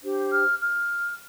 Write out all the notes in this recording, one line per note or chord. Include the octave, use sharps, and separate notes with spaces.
D4 G4 C5
F6
F6